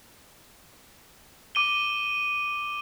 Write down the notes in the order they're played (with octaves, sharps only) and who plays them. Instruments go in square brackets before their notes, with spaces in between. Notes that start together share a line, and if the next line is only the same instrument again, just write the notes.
[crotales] D6 D#7 G7